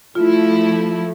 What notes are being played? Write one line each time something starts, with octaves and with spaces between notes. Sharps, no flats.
F3 A3 E4 F4